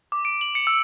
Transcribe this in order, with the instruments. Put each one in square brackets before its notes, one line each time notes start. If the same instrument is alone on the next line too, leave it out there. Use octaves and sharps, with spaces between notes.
[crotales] D6
D7
F#7
C#7
E6